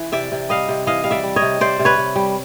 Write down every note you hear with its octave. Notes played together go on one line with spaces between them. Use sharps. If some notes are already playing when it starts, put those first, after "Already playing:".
Already playing: E3
C3 D5 E5
C3
G3 D#5 F5
C3
E3 D#5 F5
G3 F5
D5 E5
G3
C#5 D#5
C3
C3 C5 D5
C3
B4 C#5
C3
G3